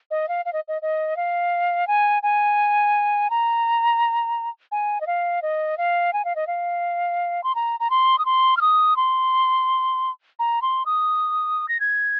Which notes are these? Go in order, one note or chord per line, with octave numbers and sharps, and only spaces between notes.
D#5
F5
F5
D#5
D#5
D#5
F5
G#5
G#5
A#5
G#5
D#5
F5
D#5
F5
G#5
F5
D#5
F5
C6
A#5
A#5
C6
D#6
C6
F6
D#6
C6
A#5
C6
D#6
A#6
G#6